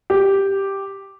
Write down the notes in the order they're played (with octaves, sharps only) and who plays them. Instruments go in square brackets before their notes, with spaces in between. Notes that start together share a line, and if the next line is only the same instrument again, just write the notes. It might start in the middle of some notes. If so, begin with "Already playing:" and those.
[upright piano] G4